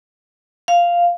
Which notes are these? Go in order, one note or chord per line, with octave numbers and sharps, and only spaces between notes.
F5